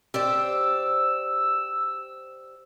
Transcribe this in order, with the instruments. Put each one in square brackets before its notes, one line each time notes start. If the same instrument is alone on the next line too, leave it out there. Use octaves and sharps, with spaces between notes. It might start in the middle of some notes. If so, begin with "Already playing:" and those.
[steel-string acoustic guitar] G4 C5 D5 [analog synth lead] E6